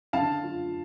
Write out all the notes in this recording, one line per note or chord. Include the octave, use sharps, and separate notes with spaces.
D3 F5 A5
F4